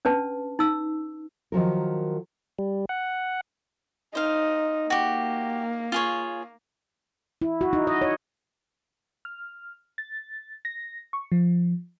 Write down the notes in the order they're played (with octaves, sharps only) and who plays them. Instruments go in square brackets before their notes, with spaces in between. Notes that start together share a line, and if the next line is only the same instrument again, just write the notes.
[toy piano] C#4 D4 B4 A5
D#4 E6
[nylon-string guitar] D#3 F3 F#3 A#4
[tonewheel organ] G3
F#5
[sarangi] D#4 [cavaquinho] C5 F5
[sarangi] A#3 [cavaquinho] F#4 G4
[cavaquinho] F4 G#4 C#5
[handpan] E4
F#4
D#4
D#5
C#5
[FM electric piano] F6
A6
A#6
C#6
F3